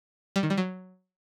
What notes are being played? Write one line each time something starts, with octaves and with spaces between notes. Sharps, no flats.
G3
D#3
G3
F#3